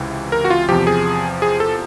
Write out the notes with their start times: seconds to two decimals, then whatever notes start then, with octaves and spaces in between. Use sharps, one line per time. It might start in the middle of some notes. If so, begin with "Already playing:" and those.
Already playing: C#2 C3 E3
0.32 A#4
0.44 F#4
0.50 F4
0.69 E2 C3 F3 G4
0.87 G#4
1.42 G#4
1.60 A4